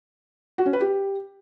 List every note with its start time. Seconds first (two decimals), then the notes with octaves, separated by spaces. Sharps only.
0.58 F#4
0.66 C#4
0.73 B4
0.81 G4